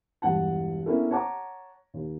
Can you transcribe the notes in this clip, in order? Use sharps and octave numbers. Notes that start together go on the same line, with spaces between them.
E1 G2 F#5 A5
A#3 B3 C#4 D4 E4 A4
C#5 F#5 A5 A#5 D6
D#2